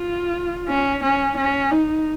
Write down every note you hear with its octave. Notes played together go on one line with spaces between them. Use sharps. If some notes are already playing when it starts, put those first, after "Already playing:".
Already playing: F4
C#4
C#4
C#4
D#4